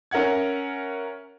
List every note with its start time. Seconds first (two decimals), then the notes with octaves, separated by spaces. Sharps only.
0.11 C#4 A#4 E5 F#5 G#6